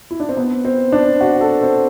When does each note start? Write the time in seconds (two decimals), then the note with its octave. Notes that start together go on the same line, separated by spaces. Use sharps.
0.11 E4
0.20 D4
0.29 C4
0.37 B3
0.65 C4
0.92 D4
1.21 F#4
1.41 A4
1.62 C4